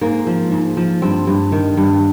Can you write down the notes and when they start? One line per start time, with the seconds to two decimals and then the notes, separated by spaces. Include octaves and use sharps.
0.01 G#2 A#3
0.27 F3
0.52 G#2
0.77 F3
1.02 G2 C4
1.27 G2
1.52 D#3
1.77 G2